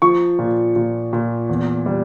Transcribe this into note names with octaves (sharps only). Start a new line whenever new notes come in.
F3 C#6
A#2
A#2
A#2
E2
G3